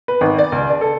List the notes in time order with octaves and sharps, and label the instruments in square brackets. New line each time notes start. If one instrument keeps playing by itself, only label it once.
[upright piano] B4
G#1
D5
C#2
D4
A4